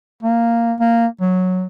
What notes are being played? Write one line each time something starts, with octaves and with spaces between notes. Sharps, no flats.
A#3
A#3
F#3